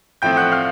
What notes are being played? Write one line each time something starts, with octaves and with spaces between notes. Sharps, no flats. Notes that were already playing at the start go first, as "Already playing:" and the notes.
A2 F3 A3 C4 G5 G6
F#5 F#6
F5 F6